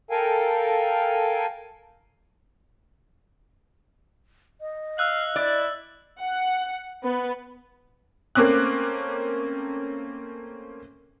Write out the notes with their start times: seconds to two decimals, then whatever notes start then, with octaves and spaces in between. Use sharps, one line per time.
0.11 A4 A#4 F5 G5 G#5
4.61 D#5
4.98 F5 E6 F#6 F#7
5.36 E4 D5
6.21 F#5
7.01 B3
8.35 A3 A#3 C4 C#4 D6 F#6